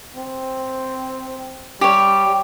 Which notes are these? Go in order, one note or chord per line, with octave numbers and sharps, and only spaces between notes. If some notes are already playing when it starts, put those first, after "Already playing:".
C4
G3 G4 C#5